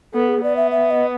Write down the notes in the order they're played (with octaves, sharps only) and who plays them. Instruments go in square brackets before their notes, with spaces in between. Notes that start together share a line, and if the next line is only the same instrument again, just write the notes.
[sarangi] B3 [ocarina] A4
[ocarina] G#4
[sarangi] B3 [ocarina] D5
[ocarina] E5
E5
D#5